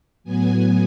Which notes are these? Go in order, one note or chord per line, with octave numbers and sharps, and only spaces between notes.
A2 F#3 B3 G#5